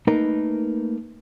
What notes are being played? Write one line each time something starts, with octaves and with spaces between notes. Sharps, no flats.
A3 A#3 D#4 A#4 B4